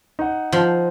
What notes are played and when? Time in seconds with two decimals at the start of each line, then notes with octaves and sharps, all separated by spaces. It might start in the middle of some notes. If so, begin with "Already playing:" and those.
0.19 D#4 F#5
0.52 F3